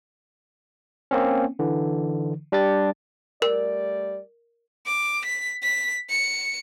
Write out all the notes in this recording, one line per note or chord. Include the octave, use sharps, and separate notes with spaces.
A#3 C4 C#4
D3 E3
G3 D4 G4 A6
G3 A3 A#4 D5
D6
B6
B6
C#7